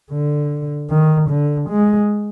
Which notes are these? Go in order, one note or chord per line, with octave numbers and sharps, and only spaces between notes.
D3
D#3
D3
G#3